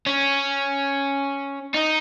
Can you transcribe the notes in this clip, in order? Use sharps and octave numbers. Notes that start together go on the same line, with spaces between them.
C#4
D#4